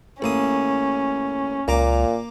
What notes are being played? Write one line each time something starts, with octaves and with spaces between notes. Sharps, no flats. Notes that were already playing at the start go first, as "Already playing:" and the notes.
A1 A#3 C#4 D#6
C#2 A#2 A#3 A#5 D6